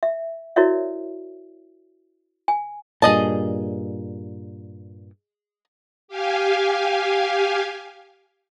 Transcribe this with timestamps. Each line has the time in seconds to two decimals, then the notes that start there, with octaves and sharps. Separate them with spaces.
0.03 E5
0.56 E4 F#4 A#4 C#5 D5 E5
2.48 G#5
3.02 G2 A#2 G#4 D#5 A5
6.08 G4 F5 G#5